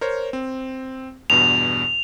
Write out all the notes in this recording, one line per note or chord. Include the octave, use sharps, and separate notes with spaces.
A#4 C5 C#5
C4
E2 G2 B2 F7